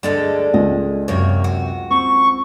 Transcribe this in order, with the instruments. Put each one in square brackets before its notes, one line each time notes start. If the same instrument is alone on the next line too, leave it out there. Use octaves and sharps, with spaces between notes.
[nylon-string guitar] D2 G2 D3 [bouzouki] G3 G#3 A4
[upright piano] C#2 [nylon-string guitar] D#5
[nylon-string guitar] F#2 C3 [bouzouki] A#3 C#5
[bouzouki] F#4
[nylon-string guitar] C4 [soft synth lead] C#6